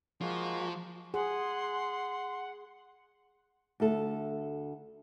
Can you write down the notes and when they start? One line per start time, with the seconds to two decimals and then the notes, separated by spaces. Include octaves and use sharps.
0.21 F3 G#3 A#3 F#4
1.14 G#4 F#5 C6
3.80 D2 A4